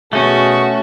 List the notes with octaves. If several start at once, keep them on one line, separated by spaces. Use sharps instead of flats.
B2 A3 C#4 F#4 G#4